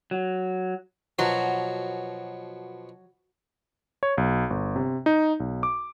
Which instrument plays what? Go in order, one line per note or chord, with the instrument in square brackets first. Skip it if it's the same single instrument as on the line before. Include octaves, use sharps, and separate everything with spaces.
[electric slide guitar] F#3
[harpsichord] B2 F3 F#4 [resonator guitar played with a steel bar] F#3
[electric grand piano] C#5
B1
G1
C3
D#4
B1
D6